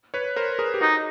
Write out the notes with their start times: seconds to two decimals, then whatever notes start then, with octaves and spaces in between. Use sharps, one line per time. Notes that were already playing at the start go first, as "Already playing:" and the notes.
0.14 B4 C#5
0.36 A#4 C5
0.59 G#4 A#4
0.74 G4
0.81 D#4 F#4 G#4